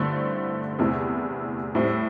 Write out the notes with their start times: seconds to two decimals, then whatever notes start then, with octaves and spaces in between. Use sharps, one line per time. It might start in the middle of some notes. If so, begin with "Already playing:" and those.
Already playing: G2 D3 A3 C4 E4
0.79 E2 C3 A3 E4
1.75 A2 G3 C4 E4